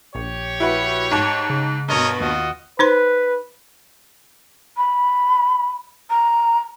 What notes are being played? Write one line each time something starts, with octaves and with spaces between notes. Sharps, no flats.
A#1 G4 C#5
E4 F#4 B4
G#2 A5
C#3
G2 B2 A#4 C#5 D#5
D#2 F4 F#4 D#5
D#4 B4 C5 C6
B5
A#5